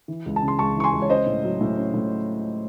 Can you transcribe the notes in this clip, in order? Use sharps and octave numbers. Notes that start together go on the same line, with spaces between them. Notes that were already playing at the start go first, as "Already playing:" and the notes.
E3
C#2
A5
C#3
C6
C#2 A5 C#6
E3 C#6
G#5 C6
C#2
C#5
C#4 C5 D#5
A2
F#3
A2
C#4
A2